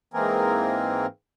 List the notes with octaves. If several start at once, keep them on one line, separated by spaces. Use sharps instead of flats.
G#2 E3 A#3 C4 G#4 A#4